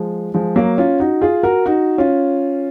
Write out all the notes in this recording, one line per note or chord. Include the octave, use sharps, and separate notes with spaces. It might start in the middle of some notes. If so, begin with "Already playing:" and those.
Already playing: F3 G#3
F3 G#3
F#3 A#3
C#4 F4
D#4 F#4
F4 G#4
F#4 A#4
D#4 F#4
C#4 F4